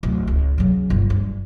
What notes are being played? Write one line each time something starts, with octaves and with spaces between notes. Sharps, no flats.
D1
C#2
C#3 F#3
G1
G2